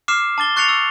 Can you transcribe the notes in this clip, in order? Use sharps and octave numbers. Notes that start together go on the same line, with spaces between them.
D6 F6 C7 E7
A5 D6 A6 G7
C#6 F#6 A6 C7 C#7 F7
E6